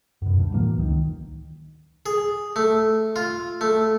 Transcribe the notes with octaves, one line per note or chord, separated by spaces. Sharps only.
F#2 B2
D2 G2
A2 E3 F#3 A#3
C#2 D#3
G#4
A3
F4
A3